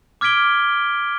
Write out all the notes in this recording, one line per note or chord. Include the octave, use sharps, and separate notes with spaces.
D6 F6 G#6 B6 D7 G7